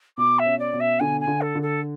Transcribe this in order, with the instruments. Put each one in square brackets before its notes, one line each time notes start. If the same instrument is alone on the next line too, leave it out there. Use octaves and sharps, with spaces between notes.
[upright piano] B2 [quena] D6
[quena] E5
[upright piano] C#4
[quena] D5
[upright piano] B2
[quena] E5
[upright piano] D3 [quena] G#5
[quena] G#5
[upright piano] D3
[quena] A4
[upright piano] D3
[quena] A4